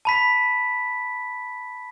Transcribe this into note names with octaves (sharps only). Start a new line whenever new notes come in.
A5 B5 B6